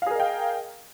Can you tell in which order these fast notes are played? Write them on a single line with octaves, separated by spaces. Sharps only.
F5 G#4 A#4 D#5 G5